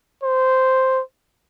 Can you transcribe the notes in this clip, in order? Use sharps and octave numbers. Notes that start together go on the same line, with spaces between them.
C5